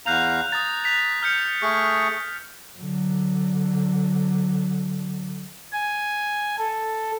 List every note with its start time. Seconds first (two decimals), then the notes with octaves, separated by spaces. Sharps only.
0.06 E2 F5 A#5 F#6 G6 F7
0.52 A#5 D#6 A6
0.84 F#6 B6 F7
1.23 F6 G6 C#7
1.62 A3 G#4 C#6
2.77 D3 F#3
5.73 G#5
6.58 A4